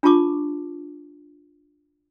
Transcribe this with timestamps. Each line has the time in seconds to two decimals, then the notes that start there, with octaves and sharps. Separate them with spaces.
0.03 D4 F4 G4 A5 C#6 D6